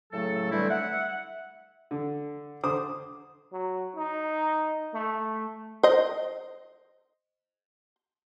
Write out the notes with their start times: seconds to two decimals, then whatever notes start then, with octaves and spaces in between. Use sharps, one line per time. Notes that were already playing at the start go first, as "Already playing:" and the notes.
0.13 A2 C#3 F#3 A3 A4
0.52 D3 E3 G3 A3 C4 E4
0.70 E5 F#5
1.91 D3
2.63 D3 C5 D6 D#6
3.52 F#3
3.96 D#4
4.94 A3
5.83 C5 D#5